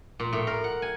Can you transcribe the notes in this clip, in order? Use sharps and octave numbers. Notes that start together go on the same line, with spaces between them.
A#2
A2
A#4
F#5
G#5